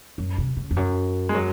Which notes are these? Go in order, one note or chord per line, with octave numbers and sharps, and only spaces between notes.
F#2
C3
C#3
F2
F#2
G#3
F#3